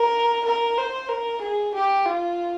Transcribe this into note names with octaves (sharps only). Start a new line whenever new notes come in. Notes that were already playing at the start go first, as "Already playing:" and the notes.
Already playing: A#4
A#4
C5
A#4
G#4
G4
F4